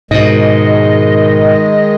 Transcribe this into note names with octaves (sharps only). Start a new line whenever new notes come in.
G#2 B2 D#3 G#3 D#5